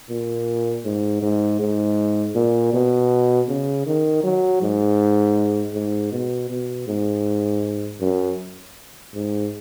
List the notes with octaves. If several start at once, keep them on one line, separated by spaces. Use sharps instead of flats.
A#2
G#2
G#2
G#2
A#2
B2
C#3
D#3
F#3
G#2
G#2
B2
B2
G#2
F#2
G#2